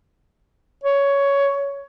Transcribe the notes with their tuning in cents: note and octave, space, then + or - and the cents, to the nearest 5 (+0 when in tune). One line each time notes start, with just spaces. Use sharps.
C#5 +10